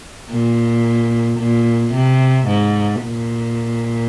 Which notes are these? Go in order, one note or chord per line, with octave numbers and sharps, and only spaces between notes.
A#2
A#2
C3
G#2
A#2